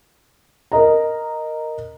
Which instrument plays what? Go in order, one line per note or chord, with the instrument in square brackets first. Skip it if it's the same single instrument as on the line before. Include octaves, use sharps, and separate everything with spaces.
[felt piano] A#4 D#5 A#5